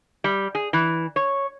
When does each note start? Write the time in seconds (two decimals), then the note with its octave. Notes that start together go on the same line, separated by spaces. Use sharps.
0.24 G3
0.55 G#4
0.73 E3
1.16 C#5